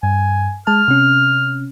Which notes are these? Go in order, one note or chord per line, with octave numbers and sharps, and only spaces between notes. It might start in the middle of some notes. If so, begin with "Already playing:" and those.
G2 G#5
G#3 A5 F6
C3 C#4